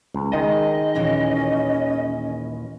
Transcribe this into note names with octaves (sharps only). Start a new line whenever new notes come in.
C#2
D#3 G#3 D#5
D#2 A#2 E3 C#4